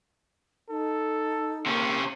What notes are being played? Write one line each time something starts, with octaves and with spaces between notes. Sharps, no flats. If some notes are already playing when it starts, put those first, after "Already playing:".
D#4 A4
C3 A#3 C#4